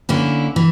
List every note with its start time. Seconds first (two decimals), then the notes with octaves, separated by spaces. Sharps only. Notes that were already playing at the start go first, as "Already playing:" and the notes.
0.09 D3 A#3 C#4 E4
0.56 E3